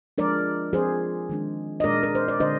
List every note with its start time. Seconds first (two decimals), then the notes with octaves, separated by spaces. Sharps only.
0.18 F3 G#3 D4 A#4 D5
0.73 F3 C4 G#4 C5
1.29 D#3 G#3 D4
1.80 D#5
1.84 A#2 G#3 D4 A#4 D5
2.03 A#4
2.15 C5
2.28 D5
2.40 D3 G#3 D4 C5 D#5